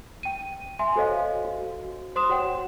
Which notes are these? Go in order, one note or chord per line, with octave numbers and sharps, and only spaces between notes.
G5 D#7
E5 G#5 C6
F#4 A4 C5 C#5 D#5 F5
F#4
C5 C6 D#6 E7
F#4 C#5 F#5 G5